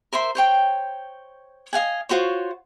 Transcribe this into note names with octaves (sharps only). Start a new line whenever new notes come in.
A#4 C5 E5 C6
C5 C#5 G5
D#5 F5 F#5 G#5
F4 F#4 C5 C#5